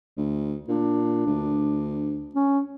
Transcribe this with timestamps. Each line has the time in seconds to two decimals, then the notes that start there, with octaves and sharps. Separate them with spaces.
0.17 D2
0.69 A#2 D4
1.27 D2
2.35 C#4